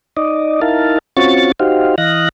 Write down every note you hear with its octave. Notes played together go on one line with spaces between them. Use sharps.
D#4 D5 D#5
D#4 E4 A#4 F5 A5
C4 C#4 F4 F#4 C#6 A6
D#4 F#4 G4 C5 F5
E3 D#5 F5 F#6 A#6